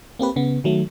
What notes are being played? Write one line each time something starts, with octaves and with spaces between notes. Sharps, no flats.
A#3 C4 G4 B4
C#3 B3
D#3 F#3 A3